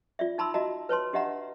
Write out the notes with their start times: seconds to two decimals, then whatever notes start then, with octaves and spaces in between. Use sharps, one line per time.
0.19 F4 D5 E5
0.38 D#4 A5 B5 C6 E6
0.54 F#4 D#5 E5 A5 A#5
0.89 B4 C#5 A5 C6
1.13 D4 G4 D#5 E5 F#5 A#5